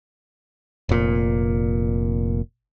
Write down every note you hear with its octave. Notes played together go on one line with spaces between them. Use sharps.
F1 A#2